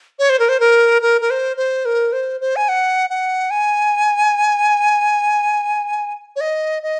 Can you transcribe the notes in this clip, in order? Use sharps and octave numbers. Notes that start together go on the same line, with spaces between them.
C#5
C5
A#4
C5
A#4
A#4
A#4
C5
C5
A#4
C5
C5
G#5
F#5
F#5
G#5
C#5
D#5
D#5